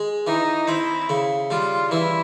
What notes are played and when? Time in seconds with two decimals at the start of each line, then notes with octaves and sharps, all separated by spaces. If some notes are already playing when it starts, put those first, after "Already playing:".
Already playing: G#3
0.27 E3 D#4
0.68 C4 E4
1.10 C#3
1.50 G3 F4
1.91 E3 E4